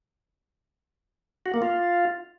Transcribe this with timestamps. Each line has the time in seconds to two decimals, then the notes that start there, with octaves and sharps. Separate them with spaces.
1.46 F#4
1.54 A#3
1.62 F4